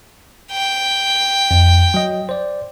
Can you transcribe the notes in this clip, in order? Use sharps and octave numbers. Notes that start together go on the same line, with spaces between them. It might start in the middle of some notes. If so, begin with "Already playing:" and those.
G5
F2
F#3 D#5
C5 D5